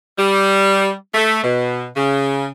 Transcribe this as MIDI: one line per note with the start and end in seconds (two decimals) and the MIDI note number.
0.19 0.93 55
1.15 1.42 57
1.44 1.86 47
1.97 2.49 49